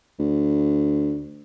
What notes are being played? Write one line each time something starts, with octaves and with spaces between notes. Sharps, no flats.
D2